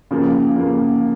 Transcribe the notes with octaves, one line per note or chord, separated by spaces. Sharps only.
C#3 F3 A#3
C#3 F3 A#3